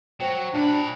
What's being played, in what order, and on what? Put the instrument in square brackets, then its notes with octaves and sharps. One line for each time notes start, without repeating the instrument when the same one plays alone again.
[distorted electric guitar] F#3 [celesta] C5 G5
[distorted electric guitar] A#2 B5 [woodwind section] D4